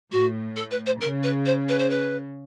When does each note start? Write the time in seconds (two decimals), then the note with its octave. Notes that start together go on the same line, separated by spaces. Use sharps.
0.12 A2 F#4
0.56 A4
0.71 B4
0.86 C5
1.01 C#3 A#4
1.23 B4
1.46 C5
1.69 B4
1.79 C5
1.90 B4